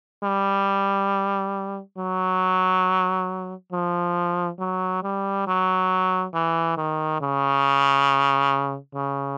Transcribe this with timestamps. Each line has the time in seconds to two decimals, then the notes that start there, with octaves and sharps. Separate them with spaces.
0.23 G3
1.98 F#3
3.72 F3
4.59 F#3
5.03 G3
5.47 F#3
6.34 E3
6.77 D#3
7.21 C#3
8.95 C#3